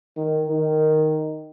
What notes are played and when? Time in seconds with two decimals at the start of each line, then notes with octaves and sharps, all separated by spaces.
0.17 D#3
0.47 D#3